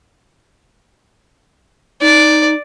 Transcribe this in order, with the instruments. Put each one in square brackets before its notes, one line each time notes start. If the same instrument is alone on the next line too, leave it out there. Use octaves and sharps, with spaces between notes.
[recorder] D#4 [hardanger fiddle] D5